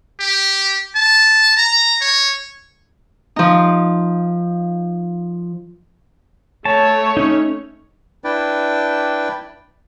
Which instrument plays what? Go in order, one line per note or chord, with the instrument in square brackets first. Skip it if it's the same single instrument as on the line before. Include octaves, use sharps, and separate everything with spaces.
[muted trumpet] G4
A5
A#5
C#5
[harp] F3 D#4
[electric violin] A3 C#5 [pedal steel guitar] A5
[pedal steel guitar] C#4 D#4
[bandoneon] D4 E4 B4 D5 G5